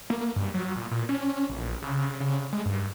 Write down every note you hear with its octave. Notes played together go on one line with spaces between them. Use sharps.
A#3
G2
F#3
A#2
A#2
C#4
A#1
C#3
C#3
G#3
G2